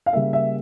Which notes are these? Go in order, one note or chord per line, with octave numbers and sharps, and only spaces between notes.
F5
C#3 G3 A#3 E5
E5